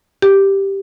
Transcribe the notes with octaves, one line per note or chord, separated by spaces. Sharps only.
G4